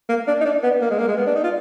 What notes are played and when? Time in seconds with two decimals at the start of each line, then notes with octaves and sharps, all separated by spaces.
0.09 A#3
0.27 D4
0.41 D#4
0.45 D4
0.63 B3
0.81 A#3
0.90 G#3
0.99 A#3
1.08 G#3
1.17 B3
1.26 D4
1.35 D#4
1.44 F4